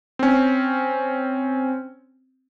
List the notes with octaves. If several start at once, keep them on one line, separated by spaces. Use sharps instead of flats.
C4 C#4